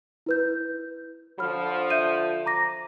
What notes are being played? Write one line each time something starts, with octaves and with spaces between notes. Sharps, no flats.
E4 B4 G6
D3 F3 B5 F6
E5 G6 D#7
A#5 D6 A#6